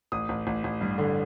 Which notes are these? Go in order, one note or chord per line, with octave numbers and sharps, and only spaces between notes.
A1 D#6
A1
A1
A1
G2
D3